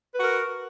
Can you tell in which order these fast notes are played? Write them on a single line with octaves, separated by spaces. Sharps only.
B4 F#4 A#4